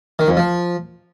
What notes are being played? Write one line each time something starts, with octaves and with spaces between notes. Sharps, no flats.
D#3
F2
F3